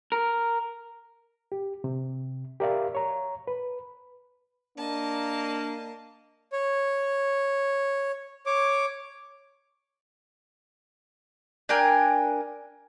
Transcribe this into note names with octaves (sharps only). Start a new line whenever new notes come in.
A#4
G4
C3
G4 A#4 D5 E5 F5
C#5 A#5
B4
A#3 D4 D#5 A5
C#5
C#5 D6
D4 A#4 G5 G#5